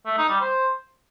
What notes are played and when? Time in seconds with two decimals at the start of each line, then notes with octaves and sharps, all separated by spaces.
0.06 A3
0.17 D#4
0.29 G3
0.41 C5